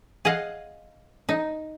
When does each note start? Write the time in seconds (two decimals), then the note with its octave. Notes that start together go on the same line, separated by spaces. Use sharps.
0.25 G#4 D#5 F5 F#5
1.29 D#4